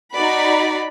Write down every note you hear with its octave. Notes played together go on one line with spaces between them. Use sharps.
D#4 F#4 D5 B5